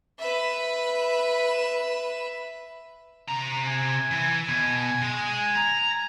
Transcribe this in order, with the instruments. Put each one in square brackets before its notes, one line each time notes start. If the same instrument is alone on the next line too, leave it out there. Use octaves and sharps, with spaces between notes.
[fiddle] B4 E5
[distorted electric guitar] C3 A#5
[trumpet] G#5
[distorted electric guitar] E3
B2
G#3
A#5